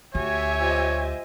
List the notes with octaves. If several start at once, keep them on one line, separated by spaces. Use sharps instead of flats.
D2 F#4 G4 C#5 E5 G#5
F4 C5 D#5